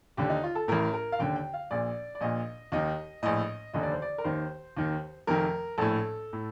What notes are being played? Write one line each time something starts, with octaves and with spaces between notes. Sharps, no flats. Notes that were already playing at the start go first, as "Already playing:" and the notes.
D#2 D3 G4
D#4
F4
A4
A1 A2 A#4
A#4
F5
D#2 D3 G5
G5
F5
A#1 A#2 D5
D5
A#1 A#2 D#5
D#2 D#3 D#5
A#1 A2 D#5
F1 D#2 D3 D#5
D5
C5
D5
A#4
D#2 D#3 C5
D#2 D#3
F1 F2 D#3 A#4
A#1 A2 A4
A2